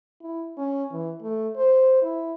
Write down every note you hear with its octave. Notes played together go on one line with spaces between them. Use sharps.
E4
C#4
E3
A3
C5
E4